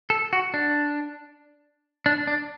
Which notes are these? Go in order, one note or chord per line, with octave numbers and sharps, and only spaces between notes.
A4
F#4
D4
D4
D4